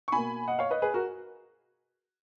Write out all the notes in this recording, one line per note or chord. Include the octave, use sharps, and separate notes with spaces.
C#6
B2 A#3 G#5 B5
D#5 F#5
C#5 F5
B4 D#5
G#4 B4
F#4 A#4